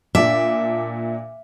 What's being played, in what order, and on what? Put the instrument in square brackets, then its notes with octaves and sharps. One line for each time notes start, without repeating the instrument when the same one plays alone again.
[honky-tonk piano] A#2 D4 D6 [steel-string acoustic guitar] E5